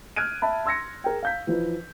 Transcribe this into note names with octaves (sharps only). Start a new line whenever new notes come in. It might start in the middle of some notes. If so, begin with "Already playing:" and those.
F6 F#6 G#6 D7 D#7
E5 A5 B5
C6 E6 G#6 A#6 C#7
G#4 A#4 G5
F5 G6 B6
E3 F3 D#4 B4